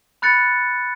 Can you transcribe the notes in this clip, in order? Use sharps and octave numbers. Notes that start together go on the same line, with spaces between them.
B5 F#6 A6 C#7